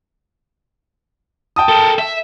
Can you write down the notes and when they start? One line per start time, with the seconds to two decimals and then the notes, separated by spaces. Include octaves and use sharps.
1.56 G5 A5 D#6
1.69 A4 A#4
1.99 E5